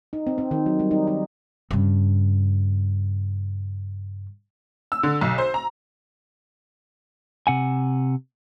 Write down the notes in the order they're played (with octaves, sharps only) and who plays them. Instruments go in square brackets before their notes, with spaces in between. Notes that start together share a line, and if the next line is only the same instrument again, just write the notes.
[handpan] D#4
C4
C4
D#3
F#3
G3
D#4
D#4
[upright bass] G2 C#3
[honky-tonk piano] E6
D3
B1
C5
A#5
[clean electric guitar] C3 F#5 G#5